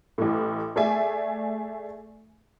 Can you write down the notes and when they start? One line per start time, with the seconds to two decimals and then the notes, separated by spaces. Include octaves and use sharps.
0.18 A1 A2
0.76 A3 G#4 D5 E5 G#5